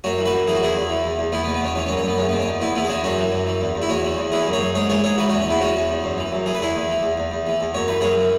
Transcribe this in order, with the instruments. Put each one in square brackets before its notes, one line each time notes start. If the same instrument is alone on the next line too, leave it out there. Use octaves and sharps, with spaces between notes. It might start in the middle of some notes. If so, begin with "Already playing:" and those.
[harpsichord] F#2 C#4 F#4
E3
F#4 B4
F#2
E3 G#4
F#4
E2 E4 G#4
E2
E3
E2
E2
E2 B3 E4
B3
B2
B3
E2 C#4
E3 C#4
C#4
F#2
C#4
F#2 B3
E2 C#4
B3
B2
C#4
E2
E2 B3 E4
E3 B3 E4
G#4
E2 C#4 F#4
F#2 C#4 F#4
E3
F#2
E3
E2
E2
E4
E2 C#4 F#4
E3
E2
E3 E4 G#4
F#2
G#4 C#5
F#2
G#2 G#4 C#5
E3 G#4 C#5
G#2 G#4 C#5
E3 F#4 B4
C#4 F#4
E2
C#4
E2 B3 E4
E3 C#4 F#4
E2
E2
F#2
E3
F#2
E3 G#4
B4
E2 E4 G#4
E2
E3
E2
E2
E2
E3
E2
F#2 C#5
E3 B4
F#2 G#4 C#5
E3